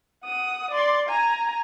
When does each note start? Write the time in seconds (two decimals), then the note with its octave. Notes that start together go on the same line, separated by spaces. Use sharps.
0.24 F#5 D#6
0.71 D5 C6
1.09 G#5 A#5